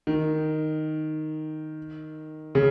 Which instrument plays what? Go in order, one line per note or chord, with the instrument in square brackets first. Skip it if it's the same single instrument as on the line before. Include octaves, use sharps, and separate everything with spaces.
[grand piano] D#3
C#3